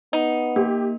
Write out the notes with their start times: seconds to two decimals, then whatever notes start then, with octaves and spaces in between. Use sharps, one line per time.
0.13 B3 D#4
0.56 A#3 G4